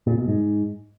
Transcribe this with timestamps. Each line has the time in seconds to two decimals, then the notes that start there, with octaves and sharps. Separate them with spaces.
0.07 A#2
0.17 B2
0.28 G#2